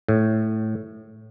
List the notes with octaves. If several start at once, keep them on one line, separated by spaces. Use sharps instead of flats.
A2